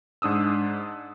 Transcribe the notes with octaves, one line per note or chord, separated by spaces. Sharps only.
G#2 D4 D#6 E6